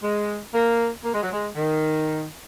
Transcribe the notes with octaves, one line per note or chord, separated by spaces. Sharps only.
G#3
A#3
A#3
G#3
F#3
G#3
D#3